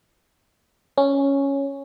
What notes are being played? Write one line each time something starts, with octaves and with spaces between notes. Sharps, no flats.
C#4